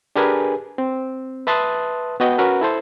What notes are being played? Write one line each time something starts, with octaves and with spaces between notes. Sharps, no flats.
D4 G4 G#4 A#4 B4 G#5
C4
B4 E5 A5 C6 D#6 F#6
B3 F#4 D#5 G5
C#4 F#4 A#4 B4
E4 A4 C5